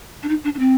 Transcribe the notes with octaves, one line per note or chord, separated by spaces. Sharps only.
D4
D#4
D4
D4
C4